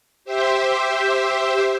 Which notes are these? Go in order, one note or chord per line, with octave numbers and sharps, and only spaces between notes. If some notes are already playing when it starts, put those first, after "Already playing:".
G4 C5 E5